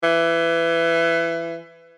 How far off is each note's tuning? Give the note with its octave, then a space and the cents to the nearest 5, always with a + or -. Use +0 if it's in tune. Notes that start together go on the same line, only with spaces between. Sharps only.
E3 +20